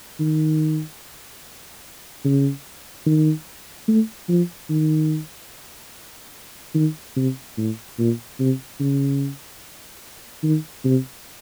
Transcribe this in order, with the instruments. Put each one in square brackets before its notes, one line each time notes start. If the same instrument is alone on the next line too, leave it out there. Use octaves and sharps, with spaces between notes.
[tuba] D#3
C#3
D#3
A3
F3
D#3
D#3
C3
A2
A#2
C3
C#3
D#3
C3